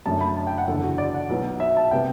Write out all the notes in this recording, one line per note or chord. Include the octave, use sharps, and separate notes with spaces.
F#2 D3 A3 A5
B5
A5
G5
F#5
F#1 E2 D3 A4
F#4
D5
F#5
B1 B2 F#3 B3
E5
A5
C3 G3 B3 G5